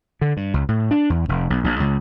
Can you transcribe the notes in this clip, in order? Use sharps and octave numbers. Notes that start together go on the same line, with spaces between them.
D3
G2
C#2
A2
D4
E2
F1
B1
A#1
C#2